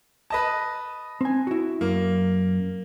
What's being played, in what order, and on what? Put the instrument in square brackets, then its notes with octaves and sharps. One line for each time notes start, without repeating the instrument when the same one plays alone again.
[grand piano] B4 D#5 A5
[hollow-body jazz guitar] C4 G#5
E4 F#4
[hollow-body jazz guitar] F#2 [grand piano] A#3